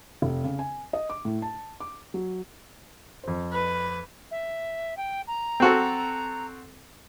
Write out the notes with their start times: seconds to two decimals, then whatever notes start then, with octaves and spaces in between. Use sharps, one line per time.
0.22 F1
0.44 C#3
0.59 G#5
0.93 D#5
1.10 D6
1.25 A2
1.42 A5
1.80 D6
2.14 F#3
3.24 F2 C5
3.53 B4
4.31 E5
4.97 G5
5.27 A#5
5.60 C4 F#4 A4